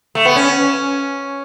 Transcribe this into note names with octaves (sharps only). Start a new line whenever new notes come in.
A3
B3
C#4